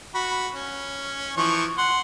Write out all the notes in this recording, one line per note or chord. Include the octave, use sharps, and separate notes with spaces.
F#4 B5
C#4
E3 F3 C#6
F#5 C6